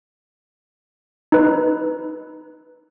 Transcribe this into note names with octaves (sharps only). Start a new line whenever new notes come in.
D#4 B4